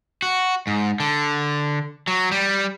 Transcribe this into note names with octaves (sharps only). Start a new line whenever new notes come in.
F#4
G#2
D3
F#3
G3